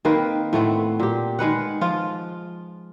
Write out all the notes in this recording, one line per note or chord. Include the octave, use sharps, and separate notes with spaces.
D#3 A#3 C4 B4
A2 A3 B3 C4
A#2 G4
D#3 G#3 B4 F#5
F3 F4